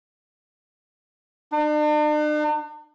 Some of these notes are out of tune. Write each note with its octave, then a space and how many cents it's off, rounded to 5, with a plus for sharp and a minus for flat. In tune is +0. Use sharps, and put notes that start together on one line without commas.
D4 +45